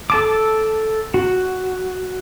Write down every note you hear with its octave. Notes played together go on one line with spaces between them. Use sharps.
A4 A5 D6
F#4